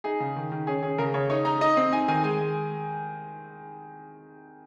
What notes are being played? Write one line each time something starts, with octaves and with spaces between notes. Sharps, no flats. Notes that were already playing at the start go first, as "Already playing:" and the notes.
D#4 G#4
C#3
D#3
D#3
C#4 G#4
C#4 G#4
C#3 A#4
C#3 C#5
D#4 C#5
D#4 A#5
D#4 D#5
C4
D#4 G#5
D#3 G#5
G#3 G#5
G#3